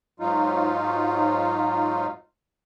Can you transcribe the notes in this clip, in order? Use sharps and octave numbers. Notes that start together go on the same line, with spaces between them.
G#2 F#3 D#4 F4